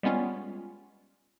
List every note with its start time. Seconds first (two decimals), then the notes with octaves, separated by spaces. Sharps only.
0.03 G3 G#3 B3 C#4 F4